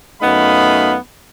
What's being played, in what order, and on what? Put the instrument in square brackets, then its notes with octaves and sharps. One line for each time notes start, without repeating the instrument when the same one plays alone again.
[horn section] F#2 A3 B3 D#4 F5 B5